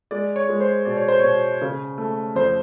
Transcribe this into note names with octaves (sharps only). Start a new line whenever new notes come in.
G#3 D5
C#5
G#3
C5
B2 D5
C#5
C5
B2 C#5
C#3
A3
F2 C5